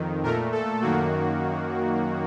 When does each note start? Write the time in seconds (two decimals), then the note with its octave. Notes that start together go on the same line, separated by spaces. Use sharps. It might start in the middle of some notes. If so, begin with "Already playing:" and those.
Already playing: F2 D#3
0.23 A#2 A3 A#4
0.52 A4
0.81 F#2 D#3 A#3 F#4